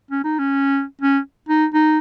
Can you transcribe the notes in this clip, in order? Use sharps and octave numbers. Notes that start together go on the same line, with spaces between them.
C#4
D#4
C#4
C#4
D#4
D#4